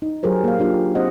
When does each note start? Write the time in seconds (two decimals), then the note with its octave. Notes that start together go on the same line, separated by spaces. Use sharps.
0.02 D#4
0.23 F#3 G4 G#4 A#4 C5
0.44 A#3 F5
0.59 A#3 D4 F4 G4
0.95 C4 G4 C5 D#5 F#5